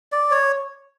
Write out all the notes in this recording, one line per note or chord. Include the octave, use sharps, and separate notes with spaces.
D5
C#5